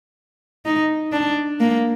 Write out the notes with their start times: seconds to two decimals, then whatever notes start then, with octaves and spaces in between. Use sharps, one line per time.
0.65 D#4
1.12 D4
1.60 A#3